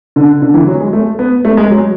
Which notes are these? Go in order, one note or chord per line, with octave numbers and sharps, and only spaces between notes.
D3
D3
E3
F#3
G#3
A3
B3
A3
G#3
F#3